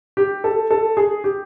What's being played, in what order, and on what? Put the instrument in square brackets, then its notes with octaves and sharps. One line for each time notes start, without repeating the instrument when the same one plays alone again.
[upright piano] G4
A4
A4
G#4
G4